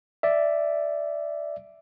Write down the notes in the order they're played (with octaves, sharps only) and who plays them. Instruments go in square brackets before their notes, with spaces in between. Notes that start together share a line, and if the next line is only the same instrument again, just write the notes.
[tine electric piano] D5 E5